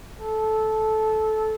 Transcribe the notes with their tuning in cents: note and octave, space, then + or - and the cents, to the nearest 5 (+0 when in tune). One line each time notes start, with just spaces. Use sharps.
A4 -15